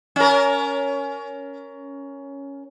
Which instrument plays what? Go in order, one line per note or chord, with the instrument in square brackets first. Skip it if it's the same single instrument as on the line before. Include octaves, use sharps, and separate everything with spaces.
[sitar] C#4 A#4